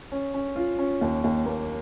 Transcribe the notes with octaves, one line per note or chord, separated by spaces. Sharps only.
C#4
C#4
F4
C#4
D#2
D#2
A#3